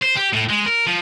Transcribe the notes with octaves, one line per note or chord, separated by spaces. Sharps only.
C5
G4
A2
G#3
A#4
F3